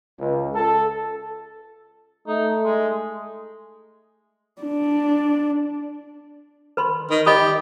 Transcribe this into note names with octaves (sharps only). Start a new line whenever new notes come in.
C#2
A4
A3 D#4
G#3
D4
B4 B5 C6
D#3
G4 D#5 B5 D#6